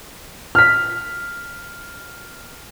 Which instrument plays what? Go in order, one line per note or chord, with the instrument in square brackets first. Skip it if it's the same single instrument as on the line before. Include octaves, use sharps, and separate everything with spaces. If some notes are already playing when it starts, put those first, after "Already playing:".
[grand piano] F6 B6